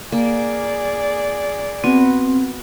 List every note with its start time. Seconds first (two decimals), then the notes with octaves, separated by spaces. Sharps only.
0.12 A#3 G#4 D5
1.84 B3 C4 F#4